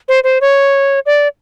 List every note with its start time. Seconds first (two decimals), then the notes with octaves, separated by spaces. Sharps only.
0.08 C5
0.24 C5
0.41 C#5
1.06 D5